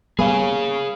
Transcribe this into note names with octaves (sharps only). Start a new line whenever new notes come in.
G3 A#3 B3 G#4 C#5 F5 G#5 B5